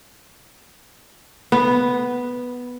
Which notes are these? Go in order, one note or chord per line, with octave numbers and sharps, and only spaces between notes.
B3